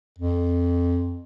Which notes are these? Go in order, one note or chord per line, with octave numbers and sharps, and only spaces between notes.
F2